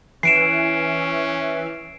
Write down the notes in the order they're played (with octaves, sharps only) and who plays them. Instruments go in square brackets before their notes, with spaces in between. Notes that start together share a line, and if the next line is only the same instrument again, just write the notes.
[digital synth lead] E3 [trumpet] C#4 [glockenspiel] C7 D7 E7